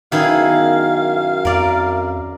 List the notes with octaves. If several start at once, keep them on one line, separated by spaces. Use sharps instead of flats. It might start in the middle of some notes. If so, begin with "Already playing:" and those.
F#2 D#3 B3 E4 G#4 F5
F2 A#4 D5